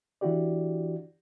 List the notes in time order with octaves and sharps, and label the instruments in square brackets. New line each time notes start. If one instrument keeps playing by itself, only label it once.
[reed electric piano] E3 D4 E4 F#4 G4 D5